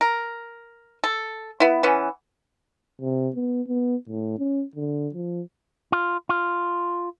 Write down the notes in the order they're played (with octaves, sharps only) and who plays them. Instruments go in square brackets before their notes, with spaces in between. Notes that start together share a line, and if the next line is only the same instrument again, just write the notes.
[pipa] A#4
A4
B3 E4
E3 B3 C#4
[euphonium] C3
B3
B3
A2
C#4
D3
F3
[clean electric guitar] F4
F4